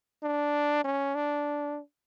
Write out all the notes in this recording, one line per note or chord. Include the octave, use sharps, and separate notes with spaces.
D4
C#4
D4